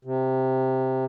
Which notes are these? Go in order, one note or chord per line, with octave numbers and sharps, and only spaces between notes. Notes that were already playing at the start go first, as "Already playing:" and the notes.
C3